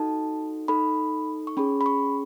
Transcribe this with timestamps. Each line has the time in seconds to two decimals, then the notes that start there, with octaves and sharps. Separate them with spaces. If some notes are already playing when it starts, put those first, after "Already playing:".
Already playing: D#4 F#4 A4 A5
0.68 D#4 A4 B5
1.47 C#6
1.57 C#4 G#4 B5
1.81 B5
1.86 C#6